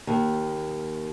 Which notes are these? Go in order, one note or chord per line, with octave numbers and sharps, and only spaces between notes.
D#2